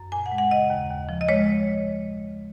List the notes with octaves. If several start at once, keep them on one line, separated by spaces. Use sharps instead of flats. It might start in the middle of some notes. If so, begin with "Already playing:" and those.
Already playing: F#2
A#2 G#5
F#5
G#3
F#5
C#3 D#5
D#2
D#2
F3
D#5
G#3 C#5